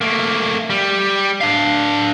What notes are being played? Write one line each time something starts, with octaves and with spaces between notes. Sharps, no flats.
A3 A#3
G3
D4 F5